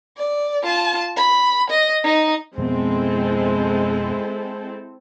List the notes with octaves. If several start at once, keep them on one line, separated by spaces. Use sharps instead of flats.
D5
F4 A5
B5
D#5
D#4 D#5
F2 B2 G#3 B3 C4 E4 A4